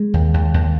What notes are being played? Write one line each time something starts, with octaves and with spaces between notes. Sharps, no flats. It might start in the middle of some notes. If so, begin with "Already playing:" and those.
Already playing: G#3
D#2
D#2
D#2